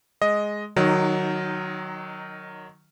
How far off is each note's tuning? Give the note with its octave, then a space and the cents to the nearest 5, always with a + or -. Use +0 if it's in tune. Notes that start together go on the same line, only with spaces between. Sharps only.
G#3 +5 D#5 +5
D#3 -25 F#3 +0 D#4 +0